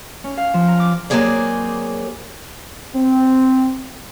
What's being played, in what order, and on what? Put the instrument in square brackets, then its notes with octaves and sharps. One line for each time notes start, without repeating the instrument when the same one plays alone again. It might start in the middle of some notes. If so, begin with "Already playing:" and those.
[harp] C#4
F5
F3
A#5
D6
[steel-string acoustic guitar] F#3 G#3 A#3 C4 G#4 D5
[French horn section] C4